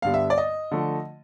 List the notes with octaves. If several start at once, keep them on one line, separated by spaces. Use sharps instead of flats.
G2 D3 G3 B3 F5
E5
D5
D#5
D3 F3 A3